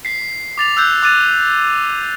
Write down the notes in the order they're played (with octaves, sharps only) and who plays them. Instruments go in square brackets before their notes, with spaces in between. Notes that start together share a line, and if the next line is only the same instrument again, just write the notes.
[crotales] B6 C7
D6 A6 F7
E6 F#6 G6
D6 F#6 A6 D#7